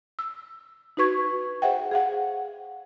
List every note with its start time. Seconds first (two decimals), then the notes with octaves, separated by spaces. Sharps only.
0.19 E6
0.97 D#4 F#4 B4 C#6 G#6
1.62 G#4 C5 E5 F#5 G5
1.91 G#4 F5 F#5